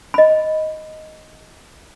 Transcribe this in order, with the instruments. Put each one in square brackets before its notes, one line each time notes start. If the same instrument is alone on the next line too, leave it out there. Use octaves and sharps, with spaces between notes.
[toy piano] D#5 B5